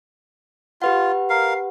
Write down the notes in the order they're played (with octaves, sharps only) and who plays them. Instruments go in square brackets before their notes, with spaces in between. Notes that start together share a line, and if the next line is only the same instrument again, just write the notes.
[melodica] F4 [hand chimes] G4 B4 F#5
[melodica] A#4 F5